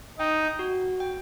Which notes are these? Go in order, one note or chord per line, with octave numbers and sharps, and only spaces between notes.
D#4 G5
F#4
G5